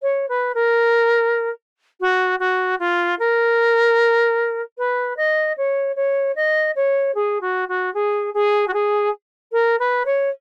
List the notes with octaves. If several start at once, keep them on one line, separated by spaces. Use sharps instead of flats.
C#5
B4
A#4
F#4
F#4
F4
A#4
B4
D#5
C#5
C#5
D#5
C#5
G#4
F#4
F#4
G#4
G#4
F#4
G#4
A#4
B4
C#5